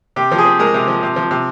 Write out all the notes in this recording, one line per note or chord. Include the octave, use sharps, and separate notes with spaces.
C3 G4
F3
G#4
C4
G#3 A#4
C3
F3
C3
F3
C3